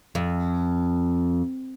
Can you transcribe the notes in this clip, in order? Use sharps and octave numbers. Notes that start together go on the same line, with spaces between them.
F2